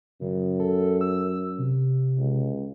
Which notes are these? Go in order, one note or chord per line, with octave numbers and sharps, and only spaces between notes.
F#2 C#3
A4
E6
C3
C#2